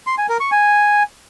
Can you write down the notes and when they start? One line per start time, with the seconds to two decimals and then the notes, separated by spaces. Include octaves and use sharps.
0.07 C6
0.18 G#5
0.29 A#4
0.40 C#6
0.52 G#5